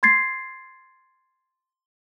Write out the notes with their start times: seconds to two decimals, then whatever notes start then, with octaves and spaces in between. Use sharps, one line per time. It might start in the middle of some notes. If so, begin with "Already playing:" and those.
0.03 C6 G#6 A6 C7